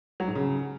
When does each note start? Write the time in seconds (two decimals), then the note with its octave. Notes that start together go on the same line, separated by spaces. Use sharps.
0.20 F#3
0.28 G#2
0.35 C#3